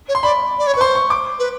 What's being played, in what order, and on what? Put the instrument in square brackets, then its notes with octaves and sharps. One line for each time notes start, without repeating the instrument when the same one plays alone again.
[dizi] C#5
[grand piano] C6
[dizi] D5 [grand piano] B5
[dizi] D5
C#5
[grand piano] C#6
[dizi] B4
[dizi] C5 [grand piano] C6
[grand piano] C#6
D6
[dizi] B4